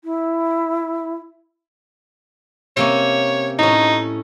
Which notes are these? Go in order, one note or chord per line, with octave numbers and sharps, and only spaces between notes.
E4
C3 A#3 C#4 C#5
A2 C#4 D#4